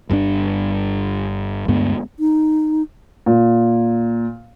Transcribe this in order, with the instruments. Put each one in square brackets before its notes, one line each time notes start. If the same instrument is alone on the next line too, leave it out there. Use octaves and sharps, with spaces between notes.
[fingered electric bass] G1 G2 C3 D4
D2 G2 G#3 B3
[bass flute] D#4
[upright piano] A#2